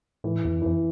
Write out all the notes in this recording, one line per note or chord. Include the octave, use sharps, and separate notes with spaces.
A2 E3
E2
F2
F2 E3